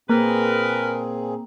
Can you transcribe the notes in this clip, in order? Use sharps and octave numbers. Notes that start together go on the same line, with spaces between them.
A#2 A#3 C4 G#4 A#4 B4